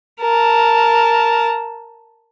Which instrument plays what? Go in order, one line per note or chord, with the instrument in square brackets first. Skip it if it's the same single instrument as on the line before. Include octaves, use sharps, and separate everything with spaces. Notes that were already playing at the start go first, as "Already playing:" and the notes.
[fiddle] A#4 A5